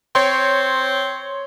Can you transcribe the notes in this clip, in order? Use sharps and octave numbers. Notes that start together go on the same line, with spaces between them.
C4 C#5 C6